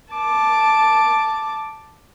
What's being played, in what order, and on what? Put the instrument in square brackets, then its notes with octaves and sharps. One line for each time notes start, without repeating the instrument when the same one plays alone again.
[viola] A5 D6